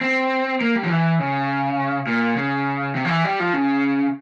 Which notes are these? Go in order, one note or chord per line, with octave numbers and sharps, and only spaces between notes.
C4
A#3
G3
F3
E3
C#3
A#2
C#3
C3
F3
E3
G3
F3
C#3